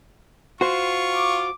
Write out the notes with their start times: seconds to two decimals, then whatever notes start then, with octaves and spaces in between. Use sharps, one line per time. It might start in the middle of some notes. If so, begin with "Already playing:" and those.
0.61 F4 F#4 C5 C#6
1.14 D6